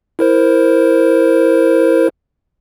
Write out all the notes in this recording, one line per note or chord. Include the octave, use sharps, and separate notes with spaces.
E4 A#4 C5